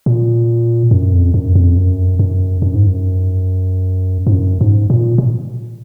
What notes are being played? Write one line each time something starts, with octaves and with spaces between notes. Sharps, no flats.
A#2
F#2
F2
F#2
F2
F#2
F#2
F#2
G#2
F#2
G#2
F#2
G#2
A#2
A#2